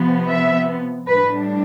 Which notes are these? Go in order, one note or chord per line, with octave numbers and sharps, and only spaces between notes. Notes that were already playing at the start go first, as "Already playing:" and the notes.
Already playing: C3 F3 B3
E5
A2 G3 D4 B4